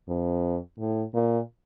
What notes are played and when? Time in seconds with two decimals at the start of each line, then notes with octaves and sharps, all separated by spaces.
0.08 F2
0.78 A2
1.14 A#2